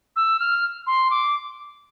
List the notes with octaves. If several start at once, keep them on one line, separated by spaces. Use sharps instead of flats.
E6
F6
C6
D6